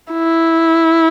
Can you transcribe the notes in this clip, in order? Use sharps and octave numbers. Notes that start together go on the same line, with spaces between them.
E4